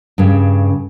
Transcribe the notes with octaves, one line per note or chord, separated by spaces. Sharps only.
G2 C#3